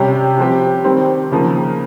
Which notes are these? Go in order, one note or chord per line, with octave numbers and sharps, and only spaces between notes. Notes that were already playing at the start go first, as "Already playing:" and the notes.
Already playing: C3 G3 C#4 G4
F3 C4 G4
D#3 G3 C4
C#3 F3 A#3